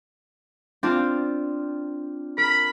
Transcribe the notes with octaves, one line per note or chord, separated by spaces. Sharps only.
C4 D4 F4
A#4 B5